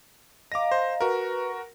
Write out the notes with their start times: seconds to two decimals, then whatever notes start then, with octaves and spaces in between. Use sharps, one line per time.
0.52 D#5 F5 A#5 D6 A#6
0.72 C5
1.01 F#4 A#4 B4